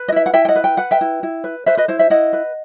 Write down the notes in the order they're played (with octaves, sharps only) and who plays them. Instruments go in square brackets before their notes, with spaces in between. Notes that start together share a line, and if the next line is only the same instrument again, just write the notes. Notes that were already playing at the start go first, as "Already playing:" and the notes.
Already playing: [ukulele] B4
D#5
E4 E5
F#5
E4 E5 G5
G5
D#5 F#5
B4
G5
B4 F#5
E5 G5
E4
E4
B4
B4 C5 E5
B4 D#5
E4 C5
C5 E5
E4 D#5 F#5
B4